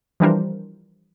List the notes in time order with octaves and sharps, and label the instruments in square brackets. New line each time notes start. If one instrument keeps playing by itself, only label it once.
[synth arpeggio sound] E3 F3 G3 D4 A#4 C5